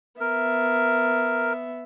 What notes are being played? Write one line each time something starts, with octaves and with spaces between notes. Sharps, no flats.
B3 A#4 E5